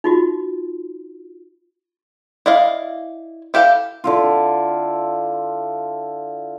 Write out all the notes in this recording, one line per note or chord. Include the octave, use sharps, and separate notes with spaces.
D#4 F4 F#4
E4 D5 D#5 F5
E4 G4 A4 F5
D3 E4 F4